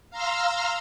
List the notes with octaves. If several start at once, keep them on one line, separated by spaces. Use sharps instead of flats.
F5 A#5 C6 E6 F6